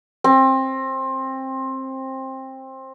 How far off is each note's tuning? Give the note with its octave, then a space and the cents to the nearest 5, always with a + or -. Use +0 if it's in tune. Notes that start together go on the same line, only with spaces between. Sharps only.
C4 +20